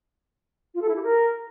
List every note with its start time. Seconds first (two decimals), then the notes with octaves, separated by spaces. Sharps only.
0.74 F4
0.82 A4
0.89 E4
0.96 G4
1.03 A#4